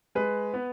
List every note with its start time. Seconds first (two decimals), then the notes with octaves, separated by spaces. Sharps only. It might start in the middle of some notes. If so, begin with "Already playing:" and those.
0.15 G#3 B4
0.54 B3